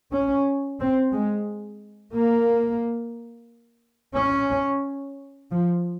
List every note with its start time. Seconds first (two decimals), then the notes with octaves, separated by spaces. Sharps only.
0.13 C#4
0.80 C4
1.14 G#3
2.15 A#3
4.16 C#4
5.52 F3